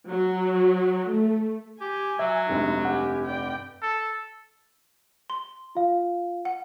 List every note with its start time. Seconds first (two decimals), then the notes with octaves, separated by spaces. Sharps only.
0.11 F#3
1.11 A3
1.81 G4 G#5
2.19 F#3 E5
2.49 F1 G2 G#3 D#4
2.85 G4 F#5 G#5
3.25 D5 G5
3.82 A4
5.30 C6
5.75 F4 F5
6.45 F#5